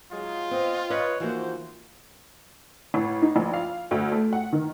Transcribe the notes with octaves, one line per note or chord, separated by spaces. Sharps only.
F#3 G#3 D#4 F4
B3 C4 D#5
B4 C#5 D#5
E3 F3 A#3 D#4 F#4 C5
A1
D#4
A#1
F5
D2
A3
F#5
D#3